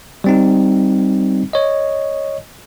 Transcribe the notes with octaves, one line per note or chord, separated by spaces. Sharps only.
G3 C4 D#4
C#5 D#5